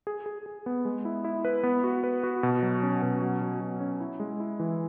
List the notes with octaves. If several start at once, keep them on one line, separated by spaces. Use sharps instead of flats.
G#4
G#4
G#4
B3
G#3
E4
E4
B4
B3
F#4
B4
F#4
B2
F#3
C#4
B2
F#3
F#3
B2
C#4
E4
G#3
E4
E3